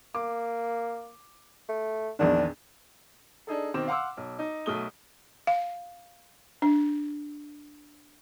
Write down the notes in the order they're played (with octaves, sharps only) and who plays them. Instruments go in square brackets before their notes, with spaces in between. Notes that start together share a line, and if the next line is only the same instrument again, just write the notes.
[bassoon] A#3 [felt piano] D6
[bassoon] A3
[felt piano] A#1 E2 D#3 [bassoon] D4
[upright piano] D4 D#4 G#4 A4
B2 D#3 C4 D6 E7
F5 F#5 C6 D6 E6
B1
D#4
B1 B2 A3 D#6 G7
[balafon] F5
D4